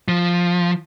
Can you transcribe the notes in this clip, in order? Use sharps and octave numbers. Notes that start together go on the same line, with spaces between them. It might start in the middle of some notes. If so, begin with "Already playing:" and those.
F3